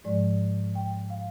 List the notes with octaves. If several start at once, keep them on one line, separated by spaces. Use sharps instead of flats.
G#2 F3 G#3 D5
G5
F5